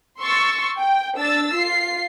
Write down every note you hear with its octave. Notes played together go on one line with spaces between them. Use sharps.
C6 C#6 E6 A6
G5
D4 E6 A6
F4 C7